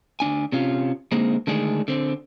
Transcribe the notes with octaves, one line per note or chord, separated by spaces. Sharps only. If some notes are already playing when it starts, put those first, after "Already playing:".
D2 G#2 D4 G#5
C3 C#4 F4
D3 G#3 A#3 C4 D#4
D3 D#3 G#3 A3 D4 G#4
D3 C4